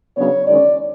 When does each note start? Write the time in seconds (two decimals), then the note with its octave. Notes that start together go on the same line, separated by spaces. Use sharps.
0.17 C#3 F#3 B3 D4 C#5
0.46 F#2 D#3 G#3 C#4 D5